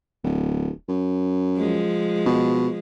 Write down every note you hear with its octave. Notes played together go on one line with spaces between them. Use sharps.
D1
F#2
F3 G#3
B2